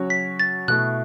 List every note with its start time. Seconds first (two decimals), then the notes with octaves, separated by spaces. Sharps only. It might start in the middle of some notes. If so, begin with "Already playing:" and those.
Already playing: C#3 F#3 C#4 F#4 C#5
0.10 B6
0.39 A6
0.68 B2 A3 E4 F#6